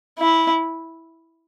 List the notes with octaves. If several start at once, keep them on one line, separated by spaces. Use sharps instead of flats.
E4